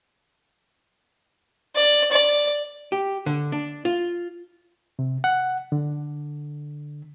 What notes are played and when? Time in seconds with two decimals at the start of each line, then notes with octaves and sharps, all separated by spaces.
1.76 D5
2.11 D5
2.92 G4
3.26 D3
3.52 D4
3.85 F4
4.99 C3
5.24 F#5
5.72 D3